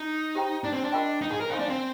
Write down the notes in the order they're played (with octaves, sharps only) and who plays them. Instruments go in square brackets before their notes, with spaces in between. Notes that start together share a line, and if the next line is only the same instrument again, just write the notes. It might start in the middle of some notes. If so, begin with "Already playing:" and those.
Already playing: [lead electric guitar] D#4
[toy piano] G4 C5 G5 A#5
[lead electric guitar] D4
C4
D4
[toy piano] F4 A#4 D#5 G5 C6
[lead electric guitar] D#4
G#4
A#4
[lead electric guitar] D#4 [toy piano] C5 F5 G#5 C6
[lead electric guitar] D4
C4